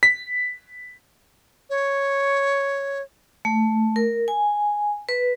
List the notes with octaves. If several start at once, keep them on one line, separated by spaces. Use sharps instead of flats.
B6
C#5
A3
A#4
G#5
B4